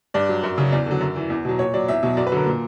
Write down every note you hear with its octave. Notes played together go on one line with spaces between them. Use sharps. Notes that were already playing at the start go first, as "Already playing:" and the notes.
G2 D5
F#3
F#2
C#3 F#3
E2 D5
D3 F#3
F#2
E3
E2
B2 F#3
A#2 C#5
F#3 D5
E2 E5
B2 F#3
F#2 D5
B4
D3 F#3 A#4
A#2